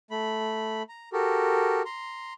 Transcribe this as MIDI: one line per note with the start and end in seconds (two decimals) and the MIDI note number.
0.11 0.83 57
0.11 0.83 83
0.89 1.09 82
1.13 1.82 66
1.13 1.82 67
1.13 1.82 69
1.13 1.82 70
1.85 2.33 82
1.85 2.33 84